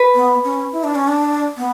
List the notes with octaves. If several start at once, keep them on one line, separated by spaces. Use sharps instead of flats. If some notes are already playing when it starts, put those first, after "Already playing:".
Already playing: B4
B3
C#4
E4
D4
C#4
D4
B3